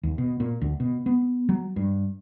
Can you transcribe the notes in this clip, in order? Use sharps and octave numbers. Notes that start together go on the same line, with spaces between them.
D#2
B2
A#2
D2
B2
B3
F#3
G2